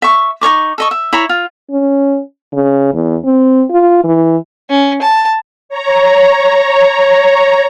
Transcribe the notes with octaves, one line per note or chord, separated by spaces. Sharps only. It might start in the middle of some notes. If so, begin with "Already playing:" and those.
E5 C#6
D#4 C#5 C#6 D6
A4 D#5 C#6
E5
E4 C#5 A#5 B5
F4
C#4
C#3
E2
C4
F4
E3
C#4
A5
C#5 A#5